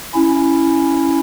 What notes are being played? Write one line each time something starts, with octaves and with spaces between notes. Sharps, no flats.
C#4 E4